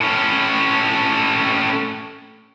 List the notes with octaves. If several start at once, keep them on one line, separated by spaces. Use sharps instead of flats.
A2 C#4